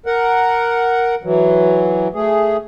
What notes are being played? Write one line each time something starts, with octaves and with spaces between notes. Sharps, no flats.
A#4 F#5
E3 F#3
A3 G#4